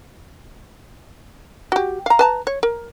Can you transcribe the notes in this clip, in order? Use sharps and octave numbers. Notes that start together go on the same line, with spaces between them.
F#4 G4
F5 A#5
B4 A5 A#5
C#5
A#4